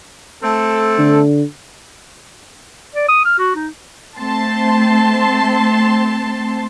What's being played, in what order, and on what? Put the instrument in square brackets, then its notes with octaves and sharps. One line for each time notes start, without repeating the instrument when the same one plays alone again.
[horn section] A3 C4 A4
[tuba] D3
[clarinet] D5
D#6
F6
F#4
D#4
[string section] A3 C4 A5 C6